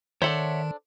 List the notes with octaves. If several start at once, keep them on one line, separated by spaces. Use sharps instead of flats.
D#3 D4 A4 C5 C#5 E5 F#5